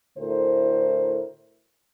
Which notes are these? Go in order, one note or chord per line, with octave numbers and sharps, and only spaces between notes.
D2 A2 E4 A#4 C5